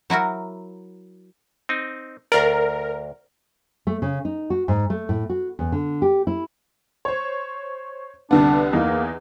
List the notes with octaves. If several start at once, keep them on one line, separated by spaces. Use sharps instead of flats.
F#3 E4 F#4 A#4
C4 D#4
D2 A#4 D5
A3
C#3
D#4
F#4
G#2
A3
A2
F#4
E2
D3
G4
E4
C5 C#5
C2 D3 B3 D4
E2 E3 A#3 D#4